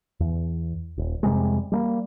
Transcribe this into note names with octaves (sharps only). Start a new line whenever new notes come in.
E2
D#1
F2 C3 G3 G#3
G3 A3 A#3